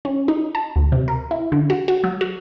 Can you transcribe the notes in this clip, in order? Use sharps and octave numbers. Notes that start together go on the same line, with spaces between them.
C#4
D#4
A5
D2
C3
A#4
E4
D3
F#4
F#4
F#3
F#4